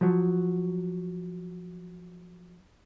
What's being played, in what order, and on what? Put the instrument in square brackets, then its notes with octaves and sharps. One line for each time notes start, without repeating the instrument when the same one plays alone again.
[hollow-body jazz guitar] F3 F#3